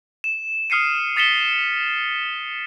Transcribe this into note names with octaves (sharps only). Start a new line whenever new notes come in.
E7
D#6 F6 C7 C#7 D#7
D#6 A6 B6 C#7 E7 G7